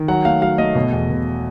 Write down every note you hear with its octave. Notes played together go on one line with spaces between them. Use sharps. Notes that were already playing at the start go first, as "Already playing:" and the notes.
Already playing: D#3
F#3 F#5
A3 F5
F#3 F5
A3 D#5
B2
E2
B2